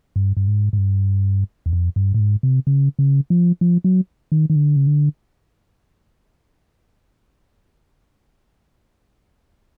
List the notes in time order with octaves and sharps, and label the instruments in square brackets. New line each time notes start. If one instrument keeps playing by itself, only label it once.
[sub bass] G2
G2
G#2
G#2
G2
E2
F2
G2
A2
G#2
C3
C#3
C#3
F3
F3
F#3
D#3
D#3
D3
C#3
D3